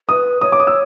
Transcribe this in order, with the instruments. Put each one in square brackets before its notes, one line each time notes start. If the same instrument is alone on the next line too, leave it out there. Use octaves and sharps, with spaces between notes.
[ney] B4 [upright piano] D#6
[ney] C#5 [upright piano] D#6
[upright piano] D6
D#6
E6